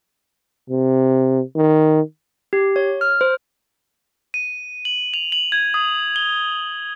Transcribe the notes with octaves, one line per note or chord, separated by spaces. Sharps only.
C3
D#3
G4
C#5
F6
C5
D#7
F#7
F7
F#7
G#6
D#6
G7